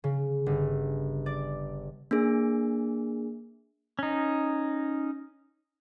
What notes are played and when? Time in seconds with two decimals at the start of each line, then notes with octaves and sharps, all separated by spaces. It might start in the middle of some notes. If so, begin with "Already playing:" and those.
0.04 C#3
0.46 G1
1.26 D5
2.11 A#3 D4 G#4
3.99 C#4 D#4